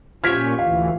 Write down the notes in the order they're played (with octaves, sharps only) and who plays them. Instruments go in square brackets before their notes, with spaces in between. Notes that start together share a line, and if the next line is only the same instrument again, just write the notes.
[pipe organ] A#2 C#4 [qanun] F3 G4 C#5 [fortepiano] F6 [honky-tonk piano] G#6 B6
[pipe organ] D2 A2 E3 [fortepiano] F5